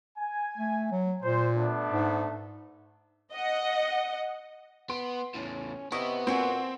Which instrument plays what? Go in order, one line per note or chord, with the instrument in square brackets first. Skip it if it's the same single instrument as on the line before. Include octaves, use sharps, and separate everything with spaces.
[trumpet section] G#5
[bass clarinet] A3
F#3
[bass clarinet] A#2 [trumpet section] C5
[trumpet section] A3 B3 D4
[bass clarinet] G#2
[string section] D#5 F#5
[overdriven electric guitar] B3 [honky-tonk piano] C6 D7
[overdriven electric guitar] E2 A2 [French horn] C#4
[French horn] C3 [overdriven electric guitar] B3 [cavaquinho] E4 D#5 [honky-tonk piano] C#6
[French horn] A#2 [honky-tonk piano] C4 [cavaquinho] E4 F#4 G#5